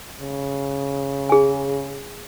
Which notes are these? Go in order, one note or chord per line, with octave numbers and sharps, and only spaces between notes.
C#3
G#4 G#5